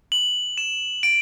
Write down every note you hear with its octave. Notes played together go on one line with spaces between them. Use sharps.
F#7
E7
D7